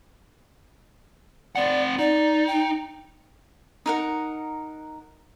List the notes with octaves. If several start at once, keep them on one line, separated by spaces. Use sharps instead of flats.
C4 D5 F#5
D#4 D5
G5
D#4 A#4 F#5